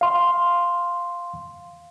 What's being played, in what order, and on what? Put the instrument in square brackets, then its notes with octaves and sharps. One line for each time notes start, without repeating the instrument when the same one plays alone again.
[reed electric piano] F5 C6